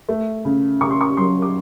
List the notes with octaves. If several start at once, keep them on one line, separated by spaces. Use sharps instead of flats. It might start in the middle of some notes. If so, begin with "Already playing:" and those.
A3
C#3
C#3 C#6
C6
C#6
F#3 C6
D6